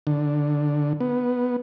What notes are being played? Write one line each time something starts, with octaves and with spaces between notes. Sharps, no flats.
D3
B3